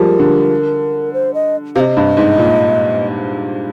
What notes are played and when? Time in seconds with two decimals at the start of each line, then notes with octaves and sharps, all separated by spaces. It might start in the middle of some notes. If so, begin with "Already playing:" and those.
Already playing: F3 G3 G#3 A#4
0.19 D3
1.13 C5
1.34 D#5
1.75 C3 F5
1.80 D#5
1.97 G2
2.17 G#2
2.38 A#2